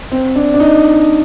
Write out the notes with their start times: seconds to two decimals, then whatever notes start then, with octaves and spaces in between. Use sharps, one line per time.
0.12 C4
0.36 D4
0.54 D4
0.60 D#4